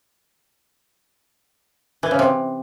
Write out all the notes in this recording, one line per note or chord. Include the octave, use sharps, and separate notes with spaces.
E3
C#3
C3